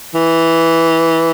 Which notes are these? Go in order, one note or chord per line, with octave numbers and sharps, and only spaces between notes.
E3